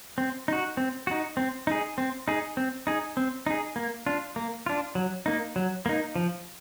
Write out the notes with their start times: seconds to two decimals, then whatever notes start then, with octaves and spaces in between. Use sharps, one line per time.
0.18 C4
0.48 D#4 F#4
0.77 C4
1.07 D#4 F#4
1.37 C4
1.67 D#4 G#4
1.98 C4
2.28 D#4 G#4
2.57 C4
2.87 D#4 G#4
3.17 C4
3.46 D#4 G#4
3.76 A#3
4.06 D4 F4
4.36 A#3
4.66 D4 F4
4.95 F#3
5.26 A#3 D#4
5.56 F#3
5.86 A#3 D#4
6.16 F3